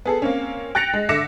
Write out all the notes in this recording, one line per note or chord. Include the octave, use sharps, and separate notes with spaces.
B3 G#4 A4
A#3 C4 C#4
G5 F#6 A6 A#6 C#7 F7
G#3
D3 E5 D6 A#6 C#7 E7